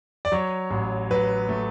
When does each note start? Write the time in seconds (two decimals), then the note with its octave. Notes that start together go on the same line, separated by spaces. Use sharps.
0.25 D5
0.32 F#3 C#5
0.71 A1
1.11 F#3 B4
1.49 A3